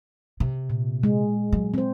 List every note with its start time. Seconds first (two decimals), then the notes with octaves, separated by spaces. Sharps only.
0.40 C3
0.70 A#2
1.03 G#3
1.52 F#3
1.74 C4 C5